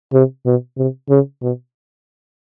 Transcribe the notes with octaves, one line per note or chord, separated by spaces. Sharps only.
C3
B2
C3
C#3
B2